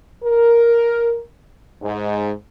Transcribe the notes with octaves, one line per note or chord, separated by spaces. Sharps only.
A#4
G#2